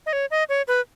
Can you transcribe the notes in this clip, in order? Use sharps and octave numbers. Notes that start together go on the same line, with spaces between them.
D#5
C#5
D#5
C#5
B4